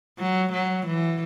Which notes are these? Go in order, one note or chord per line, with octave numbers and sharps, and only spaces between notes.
F#3
F#3
E3